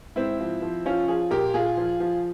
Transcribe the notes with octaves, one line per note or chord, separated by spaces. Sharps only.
G#2 C4 E4
F3
F3
F3 C#4 F4
F3 F4 G#4
A#2 G4 A#4
A#2 F4 G#4
F3
F3